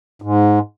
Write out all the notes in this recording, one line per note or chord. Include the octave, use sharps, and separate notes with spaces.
G#2